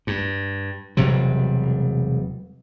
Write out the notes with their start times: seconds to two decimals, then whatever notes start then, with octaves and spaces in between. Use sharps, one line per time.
0.07 G2
0.97 E1 C3 F#3 G3